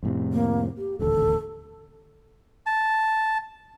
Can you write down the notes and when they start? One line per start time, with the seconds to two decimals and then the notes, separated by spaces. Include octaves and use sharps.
0.03 F2 A2 C3
0.33 A#3
0.77 G4
0.99 D#1 A1 D2 A4
2.66 A5